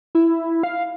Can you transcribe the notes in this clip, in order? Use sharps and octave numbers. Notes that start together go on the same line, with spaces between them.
E4
F5